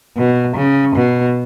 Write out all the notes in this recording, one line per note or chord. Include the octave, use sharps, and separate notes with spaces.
B2
C#3
B2